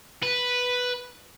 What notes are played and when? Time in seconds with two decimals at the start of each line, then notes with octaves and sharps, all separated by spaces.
0.23 B4